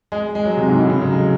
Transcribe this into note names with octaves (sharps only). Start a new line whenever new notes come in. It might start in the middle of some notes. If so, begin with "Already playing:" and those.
G#3
G#3
F#3
C3
G#2
A2
C#3
F#3
G#3